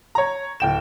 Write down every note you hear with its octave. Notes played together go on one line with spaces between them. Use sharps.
C#5 A#5
D1 G5 E7